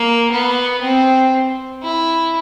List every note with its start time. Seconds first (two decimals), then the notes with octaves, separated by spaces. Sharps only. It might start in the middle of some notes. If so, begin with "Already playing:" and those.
Already playing: A#3
0.31 B3
0.82 C4
1.83 E4